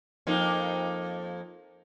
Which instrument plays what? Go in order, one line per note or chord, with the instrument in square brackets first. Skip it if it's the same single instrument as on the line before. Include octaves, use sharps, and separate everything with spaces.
[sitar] F2 A#3 D#4